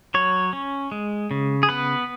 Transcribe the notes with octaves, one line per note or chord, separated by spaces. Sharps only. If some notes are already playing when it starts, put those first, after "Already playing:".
F#3 C#5
C#4
G#3
C#3
G#4
B3 B4